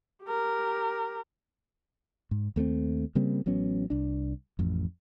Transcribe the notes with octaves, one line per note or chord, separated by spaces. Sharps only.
G4 A#4
G#2
D#2 A3 B3 C4
C#3 G3 A#3 C4
A1 F#3 B3 C#4
C2 D4
A1 F2